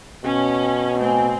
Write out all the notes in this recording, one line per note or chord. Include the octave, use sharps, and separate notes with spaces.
B2 C#4
A2 C4 G#5